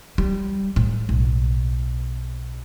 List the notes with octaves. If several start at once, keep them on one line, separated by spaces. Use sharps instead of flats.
G3
A2
B1